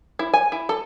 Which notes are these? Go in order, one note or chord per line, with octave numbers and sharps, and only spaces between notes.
E4
G#5
E4
A4